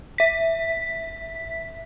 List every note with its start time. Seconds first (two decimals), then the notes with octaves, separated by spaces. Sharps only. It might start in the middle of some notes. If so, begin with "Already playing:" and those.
0.18 E5 B6